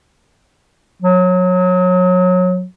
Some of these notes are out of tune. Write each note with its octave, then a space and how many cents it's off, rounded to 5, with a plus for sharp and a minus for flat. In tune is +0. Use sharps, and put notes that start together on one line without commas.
F#3 -25